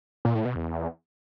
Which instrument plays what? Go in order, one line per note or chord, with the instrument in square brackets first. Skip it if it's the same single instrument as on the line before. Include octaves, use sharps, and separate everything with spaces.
[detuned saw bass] A#2
A2
B2
E2